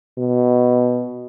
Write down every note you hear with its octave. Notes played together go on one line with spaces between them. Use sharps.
B2